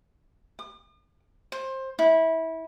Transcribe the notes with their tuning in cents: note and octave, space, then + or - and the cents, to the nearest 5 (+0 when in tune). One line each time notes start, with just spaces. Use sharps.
D#6 -45
C5 +20
E4 -25